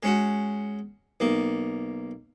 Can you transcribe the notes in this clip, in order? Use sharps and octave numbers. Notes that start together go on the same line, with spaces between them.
G#3 C#4 F#4
B1 A#3